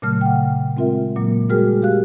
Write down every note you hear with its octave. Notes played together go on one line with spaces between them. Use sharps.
A#2 C#3 F#3 A3 F6
F#5 G5
G#3 C4 F4 A#4 E5
A#2 F#3 A#3
G3 G#3 F#4 G#4 A#4 F6
G4 F5 F#6